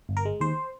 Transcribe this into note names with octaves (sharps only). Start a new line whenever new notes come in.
G1
A#4
G#3
D#2 C5